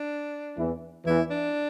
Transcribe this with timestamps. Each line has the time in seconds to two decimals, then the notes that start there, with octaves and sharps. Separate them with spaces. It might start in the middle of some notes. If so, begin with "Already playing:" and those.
Already playing: D4
0.58 E2 E3
1.06 E2 E3 E4
1.30 D4